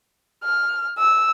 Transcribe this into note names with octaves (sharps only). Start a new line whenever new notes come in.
F6
E6